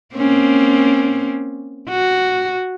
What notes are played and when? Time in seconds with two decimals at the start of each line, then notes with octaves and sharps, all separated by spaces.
0.15 A#3 C4 C#4
1.89 F#4